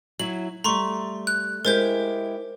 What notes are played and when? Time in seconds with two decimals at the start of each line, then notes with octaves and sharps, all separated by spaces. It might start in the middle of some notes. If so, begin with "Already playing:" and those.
0.20 F#3 E4 F#4 F#7
0.64 G3 A3 A#5 C6 C#6
1.27 F#6
1.65 G#3 E4 G4 A#4 C5 G6